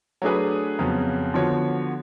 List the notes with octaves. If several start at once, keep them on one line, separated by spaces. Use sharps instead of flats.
F#3 A3 D4 G#4 B4
F2 C#3 F#3 B3
D3 F3 B3 F#4 C#5